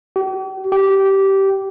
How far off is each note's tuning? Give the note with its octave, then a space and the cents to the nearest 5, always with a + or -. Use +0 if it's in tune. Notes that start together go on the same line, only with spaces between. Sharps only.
G4 -45
G4 -15